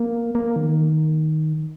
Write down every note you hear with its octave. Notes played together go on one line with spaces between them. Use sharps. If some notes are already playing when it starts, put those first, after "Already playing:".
Already playing: A#3
A#3
D#3